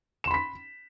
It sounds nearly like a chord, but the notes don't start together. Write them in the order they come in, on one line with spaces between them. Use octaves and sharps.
E7 C6 B5 B6